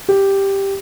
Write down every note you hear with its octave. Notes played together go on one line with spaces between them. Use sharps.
G4